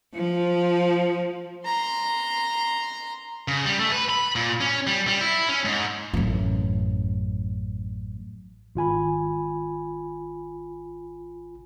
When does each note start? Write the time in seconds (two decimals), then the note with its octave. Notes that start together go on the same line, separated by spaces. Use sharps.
0.13 F3
1.65 A#5 C6
3.48 C#3
3.65 G3
3.79 A3
3.92 B4
4.09 B5
4.35 A#2
4.61 C#4
4.87 G3
5.07 G3
5.21 E4
5.49 C#4
5.65 G#2
6.14 A1 F#2
8.75 G#1 F4 G#5 B5